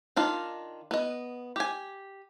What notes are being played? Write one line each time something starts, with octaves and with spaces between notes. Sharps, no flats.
D#3 D4 F4
B3 D#5
G4 G#5